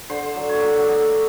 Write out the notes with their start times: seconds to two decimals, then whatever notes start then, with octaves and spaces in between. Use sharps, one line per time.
0.10 D3 C5
0.36 F#3
0.49 C#5
0.62 F#3
0.83 A3 D5 D#5
1.14 A3